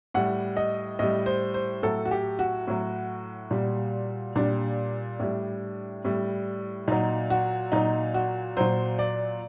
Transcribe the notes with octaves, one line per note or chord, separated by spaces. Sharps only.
A2 G3 F#5
D#5
A2 G3 D#5
C5
C5
A2 F#3 A4
F#4
G4
F#4
A2 F#3
A#2 G3
A#2 G3 D4
A2 G3
A2 G3
A#2 F#3 D#4
F#4
A#2 F#3 D#4
F#4
A#2 F#3 C5
D5